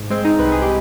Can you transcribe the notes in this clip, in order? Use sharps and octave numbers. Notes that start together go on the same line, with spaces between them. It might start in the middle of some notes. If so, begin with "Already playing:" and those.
Already playing: G#2
G#3 C4
D#4
C2 B4
G#4
G4